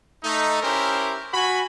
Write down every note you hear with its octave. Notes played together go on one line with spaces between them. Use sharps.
A3 D#4
C#4 E4 G4 A#4 C5
F#4 G#5 B5